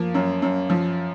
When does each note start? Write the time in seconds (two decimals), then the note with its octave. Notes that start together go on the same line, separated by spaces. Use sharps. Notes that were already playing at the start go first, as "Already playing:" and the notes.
Already playing: F3 A#3
0.14 F#2
0.42 F#2
0.70 F3